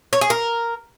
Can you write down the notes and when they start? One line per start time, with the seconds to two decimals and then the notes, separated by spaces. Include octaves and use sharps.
0.13 C#5
0.21 G#4
0.30 A#4